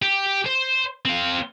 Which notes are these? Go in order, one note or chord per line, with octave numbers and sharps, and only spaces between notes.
G4
C5
C4 F5